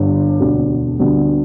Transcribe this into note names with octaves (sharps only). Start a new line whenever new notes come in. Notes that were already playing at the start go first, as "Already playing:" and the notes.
Already playing: G1 G2 D3
E1 D2 D3 B3 D4
D2 D3 G3 B3 D4